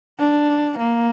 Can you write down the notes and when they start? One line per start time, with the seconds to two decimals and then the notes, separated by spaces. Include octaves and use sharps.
0.19 D4
0.79 A#3